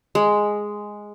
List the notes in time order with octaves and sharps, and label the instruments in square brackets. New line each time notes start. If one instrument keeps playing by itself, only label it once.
[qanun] G#3